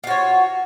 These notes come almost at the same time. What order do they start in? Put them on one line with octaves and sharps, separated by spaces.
F4 F#4 C#5